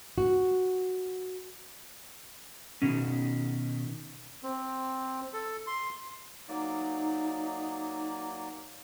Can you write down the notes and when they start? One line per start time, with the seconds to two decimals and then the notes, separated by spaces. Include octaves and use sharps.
0.18 F#4
2.82 B2 D#3 C#4
4.43 C4
5.33 A4
5.67 C6
6.49 F#3 A#3 D#4 D5